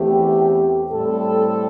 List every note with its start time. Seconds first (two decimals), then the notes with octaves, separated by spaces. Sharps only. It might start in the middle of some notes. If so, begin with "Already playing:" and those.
Already playing: E2 E3 A3 C4 G4
0.92 A2 G3 C4 A4